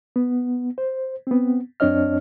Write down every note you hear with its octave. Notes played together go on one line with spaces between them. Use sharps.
B3
C5
B3 C4
F#2 C4 D4 C#5 D#5 F6